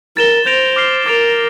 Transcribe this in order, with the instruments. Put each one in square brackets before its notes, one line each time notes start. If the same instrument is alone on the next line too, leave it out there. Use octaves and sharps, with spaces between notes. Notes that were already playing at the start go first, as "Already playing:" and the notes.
[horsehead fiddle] A#4 [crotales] A6 E7 G7
[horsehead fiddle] C5 [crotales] G6 A#6 D7 F7
[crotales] D6 F6 C7 G7
[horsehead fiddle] A#4 [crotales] D6 A6 D7 F7